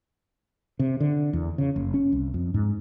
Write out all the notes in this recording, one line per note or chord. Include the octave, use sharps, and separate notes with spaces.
C3
D3
E2
C#3
F#1
C#4
C2
F2
G#2